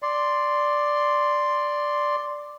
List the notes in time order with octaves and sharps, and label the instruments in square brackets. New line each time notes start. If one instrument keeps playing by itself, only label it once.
[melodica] D5 C6